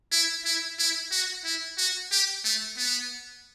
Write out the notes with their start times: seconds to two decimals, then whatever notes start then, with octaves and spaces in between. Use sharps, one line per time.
0.12 E4
0.45 E4
0.79 E4
1.12 F#4
1.45 E4
1.78 F#4
2.12 G4
2.45 A3
2.77 B3